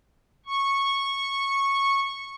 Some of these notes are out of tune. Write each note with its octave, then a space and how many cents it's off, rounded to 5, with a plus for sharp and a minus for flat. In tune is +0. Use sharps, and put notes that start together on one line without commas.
C#6 -10